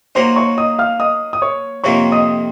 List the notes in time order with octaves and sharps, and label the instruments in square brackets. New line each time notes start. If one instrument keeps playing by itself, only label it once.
[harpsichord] F#3 A#3 D#4 [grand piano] C5 C6
[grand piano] C#5 C#6
D#5 D#6
F5 F6
D#5 D#6
D#6
C#5 C#6
[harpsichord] F2 C3 D#3 A#3 F4 [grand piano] C#5 C#6
[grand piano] D#5 D#6